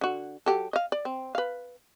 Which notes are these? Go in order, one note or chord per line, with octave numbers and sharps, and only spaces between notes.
D3 F#4
F#3 G4 A4
D#5 F5
D5
C4
B4 F5